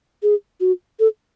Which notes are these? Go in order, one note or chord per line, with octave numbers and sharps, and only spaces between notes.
G#4
F#4
A4